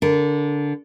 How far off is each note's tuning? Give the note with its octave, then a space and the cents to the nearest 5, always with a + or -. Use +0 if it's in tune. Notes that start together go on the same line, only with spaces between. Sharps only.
D3 -15 A#4 +0